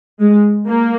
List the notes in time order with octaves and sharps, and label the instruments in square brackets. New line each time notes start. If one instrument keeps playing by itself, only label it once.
[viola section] G#3
A#3